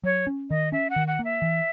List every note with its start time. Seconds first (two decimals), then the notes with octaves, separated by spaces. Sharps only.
0.04 F#3 C#5
0.27 C#4
0.50 D#3 D#5
0.72 C#4 E5
0.90 F#5
0.96 D#3
1.08 F#5
1.19 A#3
1.25 E5
1.42 E3